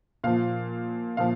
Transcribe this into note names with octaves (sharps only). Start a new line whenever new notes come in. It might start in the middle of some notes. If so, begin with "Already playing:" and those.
A#2 F3 F5
A#2 F3 F5